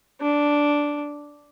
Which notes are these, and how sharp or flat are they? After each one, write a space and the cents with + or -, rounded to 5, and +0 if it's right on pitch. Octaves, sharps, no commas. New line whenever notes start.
D4 -5